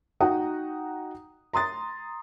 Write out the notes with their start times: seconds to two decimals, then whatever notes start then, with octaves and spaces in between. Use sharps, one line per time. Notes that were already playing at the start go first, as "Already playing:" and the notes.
0.21 D#4 F#4 F#5 G5 A#5 D#6
1.53 A#5 C6 D#6 A6